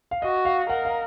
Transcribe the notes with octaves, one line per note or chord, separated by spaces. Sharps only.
F5
F#4 D#5
F5
A#4 F#5
F5